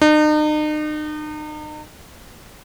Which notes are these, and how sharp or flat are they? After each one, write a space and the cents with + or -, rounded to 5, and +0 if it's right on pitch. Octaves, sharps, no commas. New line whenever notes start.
D#4 -40